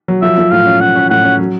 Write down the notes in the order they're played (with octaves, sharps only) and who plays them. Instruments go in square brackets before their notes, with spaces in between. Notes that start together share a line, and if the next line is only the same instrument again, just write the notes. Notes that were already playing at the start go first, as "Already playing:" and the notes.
[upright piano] F#3
[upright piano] F3 [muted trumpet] E5
[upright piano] F3
[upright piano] A2 [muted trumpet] F5
[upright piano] C#4
[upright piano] C#4 [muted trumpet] F#5
[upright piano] C#4
[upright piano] A2 [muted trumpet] F#5
[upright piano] C#4
F#3